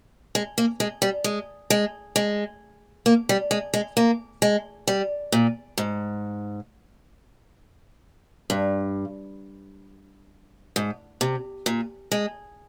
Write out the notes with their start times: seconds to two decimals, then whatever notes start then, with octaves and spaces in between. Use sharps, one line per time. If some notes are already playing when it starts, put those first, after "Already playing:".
0.35 G#3
0.58 A#3
0.80 G#3
1.02 G3
1.24 G#3
1.70 G#3
2.16 G#3
3.06 A#3
3.29 G3
3.51 G#3
3.74 G#3
3.97 A#3
4.42 G#3
4.88 G3
5.32 A#2
5.78 G#2
8.50 G2
10.76 G#2
11.21 C3
11.66 A#2
12.12 G#3